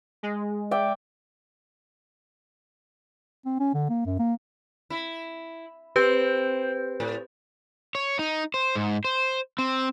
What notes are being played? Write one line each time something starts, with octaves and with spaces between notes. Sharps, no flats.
G#3
D5 E5 G5
C4
C#4
D3
A#3
F#2
A#3
E4
C4 G4 B4 G6
A2
C#5
D#4
C5
G#2
C5
C4